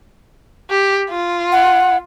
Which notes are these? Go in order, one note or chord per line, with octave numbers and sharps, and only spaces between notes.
G4
F4
F#5